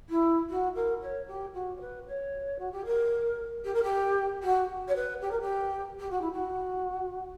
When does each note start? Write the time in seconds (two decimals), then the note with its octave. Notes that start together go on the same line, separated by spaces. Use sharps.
0.09 E4
0.49 F#4
0.75 A#4
1.01 C#5
1.27 G4
1.54 F#4
1.76 C#5
1.80 B4
2.06 C#5
2.58 F#4
2.72 G4
2.85 A#4
3.64 G4
3.74 A#4
3.83 G4
4.43 F#4
4.87 C#5
4.95 B4
5.21 G4
5.31 A#4
5.40 G4
5.99 G4
6.10 F#4
6.21 E4
6.32 F#4